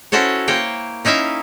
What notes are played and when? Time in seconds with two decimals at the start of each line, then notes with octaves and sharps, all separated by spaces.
0.12 C#4 E4 F#4 A4 C5 C#5
0.48 A#3 C5 C#5 G5
1.05 C#4 D#4 E4 E5 F5